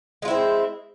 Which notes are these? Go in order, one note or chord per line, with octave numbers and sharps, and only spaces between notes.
G#3 C4 E4 F4